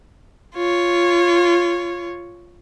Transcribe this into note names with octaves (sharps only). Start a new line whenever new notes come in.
F4 C#5